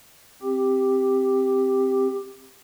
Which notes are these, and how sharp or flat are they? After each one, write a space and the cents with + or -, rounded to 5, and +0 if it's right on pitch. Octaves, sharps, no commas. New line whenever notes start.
C4 +0 G4 +5